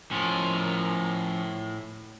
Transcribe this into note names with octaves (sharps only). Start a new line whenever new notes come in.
A2 F3 C#4 A#4